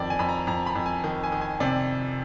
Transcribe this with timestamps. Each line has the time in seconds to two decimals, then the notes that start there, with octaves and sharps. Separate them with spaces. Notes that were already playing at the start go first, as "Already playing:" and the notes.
Already playing: F2 D#3 D5
0.10 G#5
0.19 F2 B5
0.29 A#5
0.47 F2 A#5
0.66 B5
0.75 F2
0.86 G#5
1.04 D#3
1.23 G#5
1.32 D#3
1.41 G#5
1.60 C3 D5